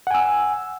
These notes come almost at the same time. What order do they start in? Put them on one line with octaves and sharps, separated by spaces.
F#5 G#5 E6